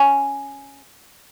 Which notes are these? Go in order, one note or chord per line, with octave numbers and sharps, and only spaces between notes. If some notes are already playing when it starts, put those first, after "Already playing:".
Already playing: C#4